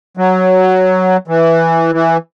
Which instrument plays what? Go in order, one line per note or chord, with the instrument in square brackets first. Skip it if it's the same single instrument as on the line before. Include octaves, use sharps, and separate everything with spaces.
[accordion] F#3
E3
E3